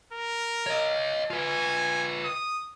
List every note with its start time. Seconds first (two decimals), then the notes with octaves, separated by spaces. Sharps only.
0.13 A#4
0.66 C#5 D#5
1.30 F4 B4 G#5
2.25 D#6